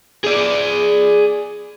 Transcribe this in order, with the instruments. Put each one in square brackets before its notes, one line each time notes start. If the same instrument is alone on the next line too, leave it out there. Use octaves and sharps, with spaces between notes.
[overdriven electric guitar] G#4 D5